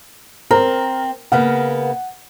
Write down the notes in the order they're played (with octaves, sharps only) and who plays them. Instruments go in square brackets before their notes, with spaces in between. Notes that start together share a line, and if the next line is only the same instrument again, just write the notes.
[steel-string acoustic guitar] C4 [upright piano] A#4 A#5
[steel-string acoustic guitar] C#3 A#3 B3 [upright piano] F#5